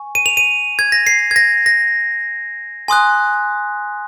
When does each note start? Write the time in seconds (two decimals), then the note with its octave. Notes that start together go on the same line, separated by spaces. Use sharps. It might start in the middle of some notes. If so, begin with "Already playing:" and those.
Already playing: G#5 C#6
0.15 D#7
0.26 F7
0.37 D#7
0.79 G#6
0.92 A#6
1.07 C7
1.31 G#6
1.36 A#6
1.66 A#6
2.88 G#5 C6 D#6 F#6